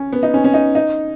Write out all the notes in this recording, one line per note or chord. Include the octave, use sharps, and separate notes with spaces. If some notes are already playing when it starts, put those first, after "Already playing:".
Already playing: C#4
B3
D#4
C#4
C#4
D#4
D#4